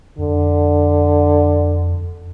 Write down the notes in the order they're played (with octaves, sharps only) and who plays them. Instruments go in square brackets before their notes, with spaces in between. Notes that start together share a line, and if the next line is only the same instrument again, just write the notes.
[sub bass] F2 [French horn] D3